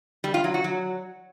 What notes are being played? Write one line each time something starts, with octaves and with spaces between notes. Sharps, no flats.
G3
F4
F#3
F#4
F#3